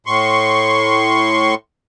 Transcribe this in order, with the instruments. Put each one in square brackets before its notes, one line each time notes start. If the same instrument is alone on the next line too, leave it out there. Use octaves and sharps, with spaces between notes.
[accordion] A2 C6 C#6